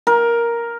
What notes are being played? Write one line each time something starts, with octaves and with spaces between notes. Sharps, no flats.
A#4